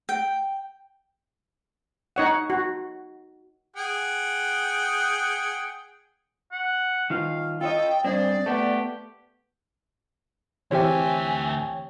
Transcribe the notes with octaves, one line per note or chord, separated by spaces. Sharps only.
G5
D#4 C#5 F#5
F#4
G#4 F#5 G5
F#5
D#3 F4 F5
F4 A4 C#5 D#5 G5
G2 C4 G#4 D5
A3 B3 G4
D2 E3 C4 G4 C#5 E5 G5 G#5